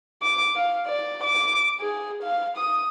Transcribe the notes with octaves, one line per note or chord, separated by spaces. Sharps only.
D6
F5
D5
D6
G#4
F5
D#6